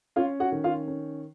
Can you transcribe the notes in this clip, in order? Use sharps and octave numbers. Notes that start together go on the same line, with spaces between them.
C#4 F4 F5
F#4 F#5
D#3
F4 F5
C#4